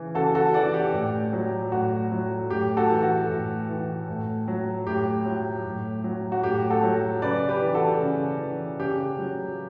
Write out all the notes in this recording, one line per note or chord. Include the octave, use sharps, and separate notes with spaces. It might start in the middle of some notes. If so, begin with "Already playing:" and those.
Already playing: C#3 E3
C#3 F#4 A4
F#4 A4
E3 D5 F#5
G4
A2
F#3
A2 F#4
F#3
A2 G4
F#4 A4
E3
F#4 A4
A2
E3
A2
F#3
A2 G4
F#3
A2
F#3
F#4
A2 G4
F#4 A4
F#3
C#3 B4 D5
G4 B4
E3
F#4 A4
C#3
E3
C#3 G4
F#3